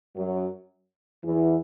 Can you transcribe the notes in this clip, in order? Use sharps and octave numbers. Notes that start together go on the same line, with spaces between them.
F#2 F#3
E2 E3